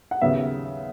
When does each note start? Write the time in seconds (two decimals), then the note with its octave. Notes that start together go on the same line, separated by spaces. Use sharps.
0.11 F#5
0.21 D#2 C#3 F#3 B3 E5